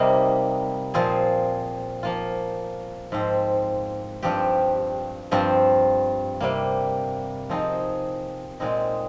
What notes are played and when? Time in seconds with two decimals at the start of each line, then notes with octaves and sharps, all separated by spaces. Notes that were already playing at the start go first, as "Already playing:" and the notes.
Already playing: C3 G3 A#3 D#4
0.94 A#2 F3 C4 F4 G#4
2.03 F3 A#3 F4
3.12 G#2 F3 C4
4.23 G2 F3 C4 G4
5.31 G2 F3 C4 F4
6.40 C3 G3 A#3
7.50 F3 C4 D#4 G#4
8.60 A#2 G#3 C4 D#4